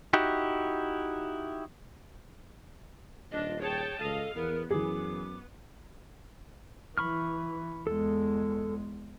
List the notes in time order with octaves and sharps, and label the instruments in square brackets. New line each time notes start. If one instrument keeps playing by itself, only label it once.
[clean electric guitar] D#4 E4 F#4 G4
[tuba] D#1 [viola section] D4 F4 [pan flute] D#5
[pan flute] G#4 [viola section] C#5 G5 A5
[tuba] C#2 [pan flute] A4 [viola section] D#5 F5
[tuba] E2 [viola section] B3 [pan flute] A#4
[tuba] F#2 [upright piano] E3 G#4 [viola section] B3 [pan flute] D6
[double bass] E3 [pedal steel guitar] B5 C#6 F6
[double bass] E2 G#3 [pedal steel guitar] A4